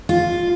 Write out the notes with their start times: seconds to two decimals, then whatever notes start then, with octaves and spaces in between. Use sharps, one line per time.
0.09 F4